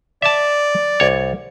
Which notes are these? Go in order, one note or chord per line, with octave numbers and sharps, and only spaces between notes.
D5 E5 A5
C2 C#5